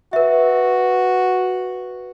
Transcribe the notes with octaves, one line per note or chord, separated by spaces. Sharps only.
F#4 B4 E5